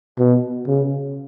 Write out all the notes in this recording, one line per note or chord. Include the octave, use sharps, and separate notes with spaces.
B2
C#3